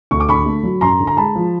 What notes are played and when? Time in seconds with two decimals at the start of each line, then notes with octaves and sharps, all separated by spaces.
0.11 D2 C#6
0.20 D6
0.29 D3 B5 C#6
0.46 A3
0.63 F#3
0.81 F#2 A#5 C6
1.00 D3
1.07 A#5
1.17 G#3 A5 B5
1.35 F3